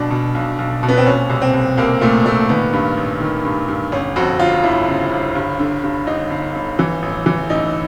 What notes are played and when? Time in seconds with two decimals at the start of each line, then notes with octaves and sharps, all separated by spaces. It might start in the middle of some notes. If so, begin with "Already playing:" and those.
Already playing: B1 B2 D4
0.10 B2
0.35 B1
0.59 B1
0.83 B2
0.89 B3
0.97 C4
1.06 A#2 C#4
1.30 C2
1.42 C4
1.53 C2
1.77 C2 A#3
2.01 A#2 A3
2.25 A#2 A3
2.49 D#3 B3
2.73 G2
2.97 A1
3.21 D#3
3.45 G2
3.68 G2
3.92 G1 C#4
4.16 F2 F#4
4.40 G1 F4
4.64 G1 E4
4.88 C#3
5.11 G1
5.35 G2
5.59 D3
5.83 G2
6.07 G1 D#4
6.30 G1
6.55 G1
6.79 E3
7.02 A1
7.26 E3
7.50 A1 D#4